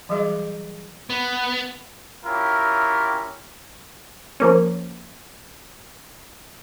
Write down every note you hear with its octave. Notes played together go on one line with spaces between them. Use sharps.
E3 F#3 G3 G#4 D#5 D6
B3
C#4 E4 F4 G4 A#4
F3 A#3 C#4